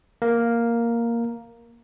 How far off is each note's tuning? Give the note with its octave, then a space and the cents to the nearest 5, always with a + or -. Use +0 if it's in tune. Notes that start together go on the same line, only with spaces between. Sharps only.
A#3 +0 A#4 +0